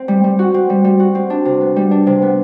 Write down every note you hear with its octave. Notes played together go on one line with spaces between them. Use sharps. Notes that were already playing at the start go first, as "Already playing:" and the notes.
Already playing: C4
G3
G3
F#4
C4
G3
G3
F#4
C4
D4
C3
B3
G3
D4
C3
B3